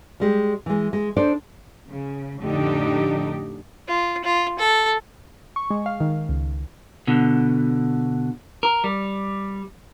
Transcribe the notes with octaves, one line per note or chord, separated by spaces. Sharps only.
G3 G#3 G4
E3 G#3
G#3
D4 D#4 A4 C5 D5
C#3
F2 A2 D3 D4 D#4 G4
F4
F4
A4
C#6
G#3
F5
D#3
C#2
B2 D3
A#4
G3